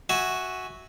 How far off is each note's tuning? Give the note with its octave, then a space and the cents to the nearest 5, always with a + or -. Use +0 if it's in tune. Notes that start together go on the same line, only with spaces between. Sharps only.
F#4 +0 E5 -15 G#5 +0